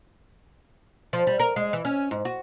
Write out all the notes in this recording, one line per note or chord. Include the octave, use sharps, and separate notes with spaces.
F3
G3
A#4
G#3
E3
C#4
G#2
F#4